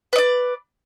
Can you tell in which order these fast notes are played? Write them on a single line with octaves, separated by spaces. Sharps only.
B4 D#5 D5